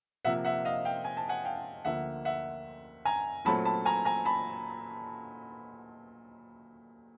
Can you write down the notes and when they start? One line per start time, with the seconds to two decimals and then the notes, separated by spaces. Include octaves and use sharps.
0.25 C3 F3 A#3 E5 F#5
0.45 E5 F#5
0.65 D#5 F5
0.85 F5 G5
1.05 G#5
1.17 A5
1.29 F#5 G#5
1.45 F5 G5
1.85 D2 D3 F3 A#3 E5 F#5
2.25 E5 F#5
3.05 G#5 A#5
3.45 A#2 F#3 A3 C4 A5 B5
3.65 A5 B5
3.85 G#5 A#5
4.05 G#5 A#5
4.25 A5 B5